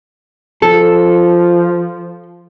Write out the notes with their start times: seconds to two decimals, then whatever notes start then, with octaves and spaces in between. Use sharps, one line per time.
0.62 F3 A4